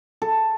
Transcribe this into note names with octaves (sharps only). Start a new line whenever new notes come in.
A4